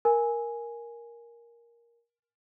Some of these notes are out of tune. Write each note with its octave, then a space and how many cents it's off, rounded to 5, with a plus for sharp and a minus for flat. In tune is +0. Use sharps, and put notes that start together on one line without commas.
A#4 +10 G#5 +0